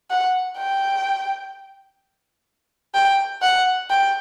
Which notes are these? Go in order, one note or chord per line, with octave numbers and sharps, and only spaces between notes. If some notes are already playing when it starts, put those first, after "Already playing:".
F#5
G5
G5
F#5
G5